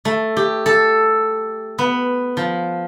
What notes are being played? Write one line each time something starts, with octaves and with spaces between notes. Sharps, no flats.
A3
G4
A4
B3
F3